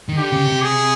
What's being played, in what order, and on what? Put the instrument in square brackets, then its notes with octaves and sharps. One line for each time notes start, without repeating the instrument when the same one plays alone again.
[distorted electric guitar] D#3
[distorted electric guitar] D3 [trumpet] G4
[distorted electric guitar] C#3
C3
[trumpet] G#4